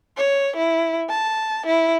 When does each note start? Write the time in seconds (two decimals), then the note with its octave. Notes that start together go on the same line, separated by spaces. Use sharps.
0.17 C#5
0.57 E4
1.10 A5
1.66 E4